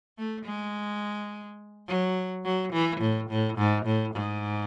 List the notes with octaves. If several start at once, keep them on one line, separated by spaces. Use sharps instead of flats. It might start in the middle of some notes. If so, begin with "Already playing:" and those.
A3
G#3
F#3
F#3
E3
A2
A2
G#2
A2
G#2